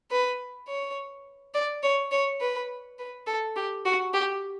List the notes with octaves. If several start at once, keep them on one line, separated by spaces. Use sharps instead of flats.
B4
C#5
D5
C#5
C#5
B4
B4
A4
G4
F#4
G4